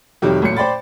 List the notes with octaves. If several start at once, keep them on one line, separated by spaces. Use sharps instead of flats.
F2 C3 D#3 F#3 G3
A1 A#2 F#3 C#7
C5 D5 G5 B5 A6